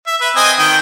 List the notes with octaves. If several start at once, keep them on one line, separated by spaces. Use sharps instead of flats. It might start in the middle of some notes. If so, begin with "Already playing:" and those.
E5
B4 E5
C4 D#5 G#5
D#3 G5